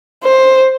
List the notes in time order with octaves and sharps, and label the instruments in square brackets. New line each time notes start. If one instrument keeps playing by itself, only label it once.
[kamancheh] C5